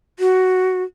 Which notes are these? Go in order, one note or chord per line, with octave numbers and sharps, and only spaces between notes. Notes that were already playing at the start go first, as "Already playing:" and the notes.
F#4